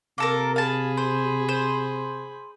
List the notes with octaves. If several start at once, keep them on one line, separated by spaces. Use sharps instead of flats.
C3 A#3 A4 A#4
G#4 F5 A5 B5
C5
C5